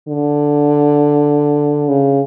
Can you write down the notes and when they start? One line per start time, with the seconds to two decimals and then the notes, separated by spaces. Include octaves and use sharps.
0.08 D3
1.89 C#3